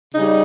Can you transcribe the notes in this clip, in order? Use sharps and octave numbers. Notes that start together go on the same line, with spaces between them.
C#3 G3 D#4